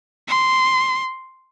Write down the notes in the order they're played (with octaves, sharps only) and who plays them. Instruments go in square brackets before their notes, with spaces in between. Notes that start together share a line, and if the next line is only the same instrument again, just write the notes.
[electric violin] C6